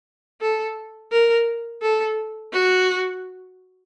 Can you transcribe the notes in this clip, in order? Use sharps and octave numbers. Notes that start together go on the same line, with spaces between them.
A4
A#4
A4
F#4